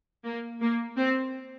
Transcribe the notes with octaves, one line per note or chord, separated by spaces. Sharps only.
A#3
A#3
C4